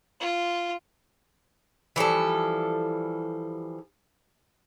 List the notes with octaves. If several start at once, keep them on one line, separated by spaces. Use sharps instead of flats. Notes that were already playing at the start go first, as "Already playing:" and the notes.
F4
E3 F3 G3 A4